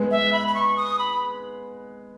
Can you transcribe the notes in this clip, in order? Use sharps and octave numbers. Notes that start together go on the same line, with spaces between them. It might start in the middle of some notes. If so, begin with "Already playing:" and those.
Already playing: G#3 B3
E5
B5
B5
C#6
D#6
B5